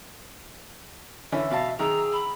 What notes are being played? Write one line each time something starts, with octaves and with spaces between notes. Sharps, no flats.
D3 E3 C#4 E5
B2 F5 A5
D#3 G#4 A#5 E6
B5